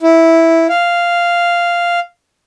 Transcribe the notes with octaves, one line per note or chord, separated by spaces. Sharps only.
E4
F5